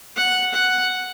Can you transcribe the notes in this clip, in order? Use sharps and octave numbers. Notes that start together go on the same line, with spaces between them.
F#5
F#5